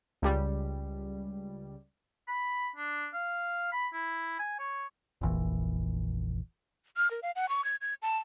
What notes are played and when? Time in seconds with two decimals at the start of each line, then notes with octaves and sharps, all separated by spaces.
0.22 C#2 G3
2.28 B5
2.76 D4
3.13 F5
3.72 B5
3.93 E4
4.39 G#5
4.59 C#5
5.21 F1 A#1 E3
6.97 F6
7.11 A#4
7.23 F5
7.36 F#5
7.49 C#6
7.65 G#6
7.81 G#6
8.02 A5